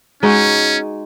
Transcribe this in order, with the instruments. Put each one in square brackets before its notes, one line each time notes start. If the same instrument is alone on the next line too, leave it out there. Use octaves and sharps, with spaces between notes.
[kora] G#3 D#4 F#4 [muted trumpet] C#4